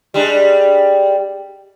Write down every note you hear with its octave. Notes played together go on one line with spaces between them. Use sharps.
G3 G#3 D4